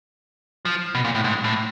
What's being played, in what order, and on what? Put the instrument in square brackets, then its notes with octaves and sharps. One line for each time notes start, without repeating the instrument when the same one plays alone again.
[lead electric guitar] F3
B2
A#2
A2
G#2
A2